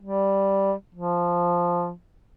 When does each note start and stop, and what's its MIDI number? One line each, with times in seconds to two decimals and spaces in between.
0.03 0.72 55
0.95 1.91 53